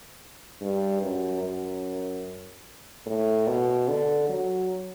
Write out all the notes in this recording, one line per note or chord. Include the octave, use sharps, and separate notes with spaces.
G2
F#2
F#2
A2
B2
D3
F#3